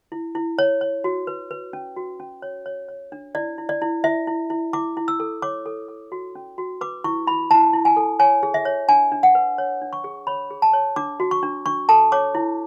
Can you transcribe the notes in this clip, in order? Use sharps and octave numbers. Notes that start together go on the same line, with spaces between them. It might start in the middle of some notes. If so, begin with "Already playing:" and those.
E4
E4
C#5
C#5
F#4
B4
B4
C#4
F#4
C#4
C#5
C#5
C#5
D4
E4 D5
E4
D5
E4
E4 E5
E4
E4
E4 D6
E4
E6
A4
C#5 D6
A4
A4
F#4
C#4
F#4
B4 D6
E4 C#6
E4 B5
E4 A5
E4
G#5
A4
C#5 G#5
G#4
E5
C#5
D4 G#5
D4
F#5
B4
C#5
D4
C#6
G#4
C#5 B5
G#4
A5
C#5
D4 D6
F#4
C#6
D4
D4 C#6
A4 A5
C#5 D6
E4